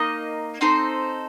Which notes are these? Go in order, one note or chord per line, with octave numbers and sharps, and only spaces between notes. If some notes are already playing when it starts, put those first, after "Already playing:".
Already playing: A#3 D#4 D#5
C4 D#4 A4 C5